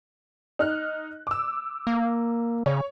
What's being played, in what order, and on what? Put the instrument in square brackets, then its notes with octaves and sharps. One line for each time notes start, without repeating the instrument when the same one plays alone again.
[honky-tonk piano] D#4 F6 F#6
D6 E6
[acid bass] A#3
[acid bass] C#3 [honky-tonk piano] C#5